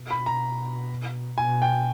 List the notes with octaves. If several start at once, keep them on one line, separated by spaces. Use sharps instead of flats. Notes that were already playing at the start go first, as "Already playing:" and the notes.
Already playing: B2
B5
A#5
B2 G#5
G5